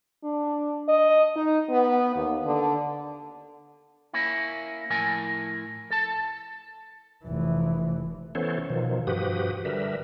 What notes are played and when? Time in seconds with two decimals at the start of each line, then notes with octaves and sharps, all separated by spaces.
0.24 D4
0.89 D#5
1.36 D#4
1.70 B3
2.16 D#2
2.46 D3
4.13 A#3 C#4 E4
4.90 A2 F3 E4 A#4 G#5
5.90 A4 A5
7.25 F1 E3
8.35 E3 B3 C#4 A4 C5 C#5
8.70 B2 D#3 F3
9.07 G2 F3 F#4 G4 B4 D#6
9.65 D3 G3 A#4 B4 E5